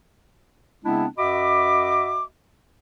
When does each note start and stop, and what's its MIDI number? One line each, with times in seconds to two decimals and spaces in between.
0.85 1.05 49
0.85 1.05 56
0.85 1.05 59
0.85 1.05 60
0.85 1.05 62
0.85 1.05 64
1.18 2.24 42
1.18 2.24 66
1.18 2.24 75
1.18 2.24 76
1.18 2.24 83
1.18 2.24 86